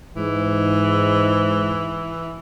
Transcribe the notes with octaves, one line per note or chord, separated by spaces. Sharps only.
G#2 E3